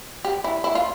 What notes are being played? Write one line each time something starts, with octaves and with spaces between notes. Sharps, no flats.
G4
E4
E4
F4